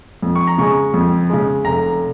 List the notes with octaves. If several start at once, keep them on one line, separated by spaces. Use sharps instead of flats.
F2
C#6
A#5
C#3 G#3 C#6
F2
C#3 G#3
F1 A#5